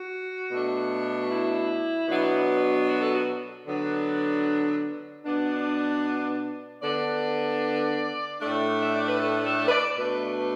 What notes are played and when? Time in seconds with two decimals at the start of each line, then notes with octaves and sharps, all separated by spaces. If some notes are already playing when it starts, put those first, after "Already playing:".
Already playing: F#4
0.51 B2 A3 D4
1.30 E4
2.08 B2 F#3 B3 D4
2.88 F#4
3.01 A4
3.13 F#4
3.67 D3 F#3 B3 D4
5.25 B2 B3 D4
6.82 D3 B3 D4 D5
8.40 A2 A3 D4
8.81 E5
8.94 D5
9.07 B4
9.19 A4
9.45 A4
9.68 B4
9.71 D5
9.97 B2 A3 D4 B4
10.38 B4